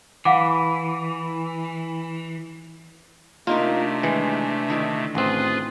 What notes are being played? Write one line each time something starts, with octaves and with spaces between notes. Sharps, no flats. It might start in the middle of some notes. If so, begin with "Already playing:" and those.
E3 F5 F#5 D6
C3 A3 A#3 D4 D#4 F4 A#4
D#3 E3 G#3
D3 D#3 E4
A1 C4 F4 G#4 B4